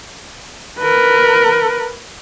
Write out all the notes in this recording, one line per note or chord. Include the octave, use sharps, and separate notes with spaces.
A#4 B4